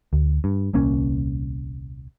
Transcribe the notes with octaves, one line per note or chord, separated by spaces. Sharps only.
D2
G2
D#1 C2 A#3 C#4